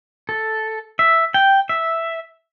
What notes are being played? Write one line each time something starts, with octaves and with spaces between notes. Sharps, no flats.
A4
E5
G5
E5